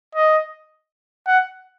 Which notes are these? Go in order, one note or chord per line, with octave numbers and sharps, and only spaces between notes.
D#5
F#5